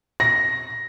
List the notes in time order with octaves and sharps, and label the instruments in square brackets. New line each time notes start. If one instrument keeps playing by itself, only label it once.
[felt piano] A#6